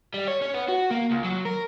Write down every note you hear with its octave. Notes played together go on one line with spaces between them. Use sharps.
G3
C#5
C#4
B3
F#4
A#3
C#2
F#3
A#4